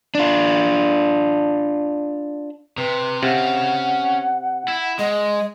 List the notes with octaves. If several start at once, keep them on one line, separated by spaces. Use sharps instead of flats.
D4 F4
C3 B4
C3 C#4 F5 F#5
E4
G#3 D#5